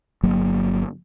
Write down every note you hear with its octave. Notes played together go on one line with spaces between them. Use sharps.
G1 F#3 A#3